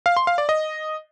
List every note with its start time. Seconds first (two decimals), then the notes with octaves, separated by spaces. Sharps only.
0.06 F5
0.17 C6
0.27 F5
0.38 D5
0.49 D#5